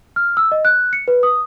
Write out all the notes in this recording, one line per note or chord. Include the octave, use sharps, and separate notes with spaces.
F6
E6
D#5
F#6
C#7
B4
D#6